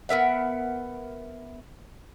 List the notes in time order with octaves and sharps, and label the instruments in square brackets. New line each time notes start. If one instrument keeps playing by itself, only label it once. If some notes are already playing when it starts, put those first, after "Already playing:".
[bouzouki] B3 A#4 E5 F#5